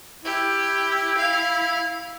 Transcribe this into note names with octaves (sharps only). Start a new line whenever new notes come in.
E4 G4
F5